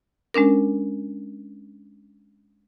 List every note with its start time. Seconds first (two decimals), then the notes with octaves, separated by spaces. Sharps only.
0.34 G#3 C#4 D4 A#4